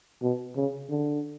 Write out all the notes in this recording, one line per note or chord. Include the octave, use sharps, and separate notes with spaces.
B2
C#3
D3